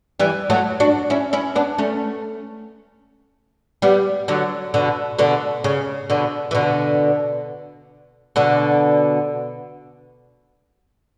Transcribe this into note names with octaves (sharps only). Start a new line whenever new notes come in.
E3 G3
F#3 A3
D4 F#4
C#4 E4
C#4 E4
B3 D4
A3 C#4
G3 B3
D3 F#3
B2 D3
B2 D3
C#3
B2 D3
E3
B2 D3
B2 D3